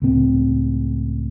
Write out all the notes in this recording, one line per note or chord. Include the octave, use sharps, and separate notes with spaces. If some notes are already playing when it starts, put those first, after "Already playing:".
C#2 A2 C4